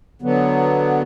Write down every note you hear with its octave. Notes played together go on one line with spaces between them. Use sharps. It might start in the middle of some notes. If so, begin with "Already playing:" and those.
D3 F#3 B3